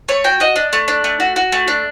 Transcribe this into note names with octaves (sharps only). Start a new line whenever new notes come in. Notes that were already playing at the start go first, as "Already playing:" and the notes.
A3 C#5
F#4 G5
F#4 D#5
D4
A3
D4
A3
F#4
F#4
A3
D4